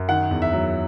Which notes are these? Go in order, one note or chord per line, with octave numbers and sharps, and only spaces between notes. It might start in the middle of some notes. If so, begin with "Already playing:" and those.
Already playing: F#2
D#3 F#5
E2
E5
F#3